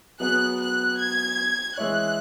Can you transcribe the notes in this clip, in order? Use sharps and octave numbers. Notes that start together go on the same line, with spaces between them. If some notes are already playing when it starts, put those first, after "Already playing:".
F#3 B3 G#4 B4 F#6
F#6
G#6
E3 G#3 E4 C#5 F#6